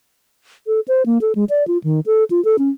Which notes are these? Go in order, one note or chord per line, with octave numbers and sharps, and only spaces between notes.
A4
C5
A#3
A4
G#3
D5
F4
D#3
A4
F4
A4
C#4